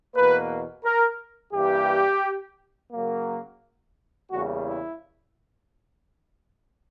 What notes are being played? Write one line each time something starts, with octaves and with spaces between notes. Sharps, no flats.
E2 B2 A#3 B4
A#4
G2 E3 A#3 G4
C#3 F#3 A#3
E2 C#3 G3 A#3 F#4
E4